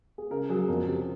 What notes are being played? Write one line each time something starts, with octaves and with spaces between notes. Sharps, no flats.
G#4
C#3 A#4
F#3 G#4
F2 A#4
C3